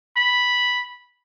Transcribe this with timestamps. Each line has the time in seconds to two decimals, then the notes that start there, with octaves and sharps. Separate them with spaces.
0.17 B5